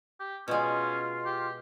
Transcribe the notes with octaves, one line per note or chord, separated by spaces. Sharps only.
G4
B2 G#3 C#4 F4
G4